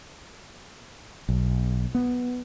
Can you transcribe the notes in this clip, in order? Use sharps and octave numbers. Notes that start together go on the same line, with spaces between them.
B1
B3